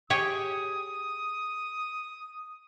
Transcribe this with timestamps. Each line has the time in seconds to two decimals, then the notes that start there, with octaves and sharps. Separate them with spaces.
0.10 G4 G#4 C#5 D#6